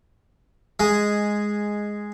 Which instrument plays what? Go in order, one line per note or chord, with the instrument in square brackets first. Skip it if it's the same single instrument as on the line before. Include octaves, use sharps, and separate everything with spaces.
[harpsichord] G#3